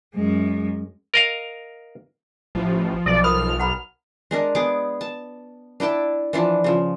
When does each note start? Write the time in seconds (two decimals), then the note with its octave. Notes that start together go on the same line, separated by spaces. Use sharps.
0.15 F#2 G#3
1.14 A#4 D#5 F5
2.55 A1 F3
3.06 B1 D5
3.24 A#4 B5 D#6 F6
3.60 F#5 A#5 B5
4.31 G#3 D4 A#4
4.55 B3 G#4 D6
5.01 A5
5.80 D4 E4 G5 A5
6.33 E3 F3 D4
6.64 C#3 F3